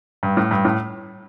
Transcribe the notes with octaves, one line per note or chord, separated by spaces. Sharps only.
G2
A2
G2
A2